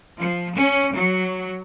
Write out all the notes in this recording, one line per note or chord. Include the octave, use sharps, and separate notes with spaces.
F3
C#4
F#3